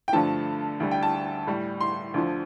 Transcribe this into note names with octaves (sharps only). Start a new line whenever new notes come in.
G5
G2 D3 F3 A3 A5
D2 D3 G3
G5
A5
A2 G3
C6
D2 D3 F3